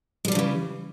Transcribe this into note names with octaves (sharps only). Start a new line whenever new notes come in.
C#3 E3 F3 G3 G#3